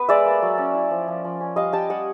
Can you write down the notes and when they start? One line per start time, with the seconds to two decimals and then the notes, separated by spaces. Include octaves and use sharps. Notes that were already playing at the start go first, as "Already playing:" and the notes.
Already playing: B3 B4
0.09 G#3 D5 E5
0.26 A#3
0.42 F#3
0.58 C#4
0.74 E4
0.91 F3
1.08 F3
1.25 F3
1.40 C#4
1.56 G3 D#5 F5
1.73 G3 G5 A5
1.89 G3 F#5 G#5